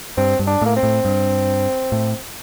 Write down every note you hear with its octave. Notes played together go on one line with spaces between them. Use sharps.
G2 C4
G2
D4
A2 A#3
C4
A2
G2
A2